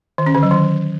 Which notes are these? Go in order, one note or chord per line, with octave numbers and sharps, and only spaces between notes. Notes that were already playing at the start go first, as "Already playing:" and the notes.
D#3
C#4
D3
F#3
D#3